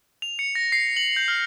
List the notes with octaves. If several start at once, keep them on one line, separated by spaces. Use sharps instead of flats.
F7
C#7
A#6
C7
F#7
G6
F6